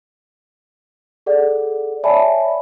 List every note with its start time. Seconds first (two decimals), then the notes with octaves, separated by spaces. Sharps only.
1.26 G#4 A4 D5 F#5
2.04 C#5 D5 E5 G#5 A5 B5